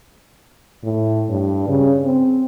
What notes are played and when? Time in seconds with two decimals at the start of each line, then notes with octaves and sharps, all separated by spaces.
0.83 A2
1.29 G2
1.68 C#3
2.05 C4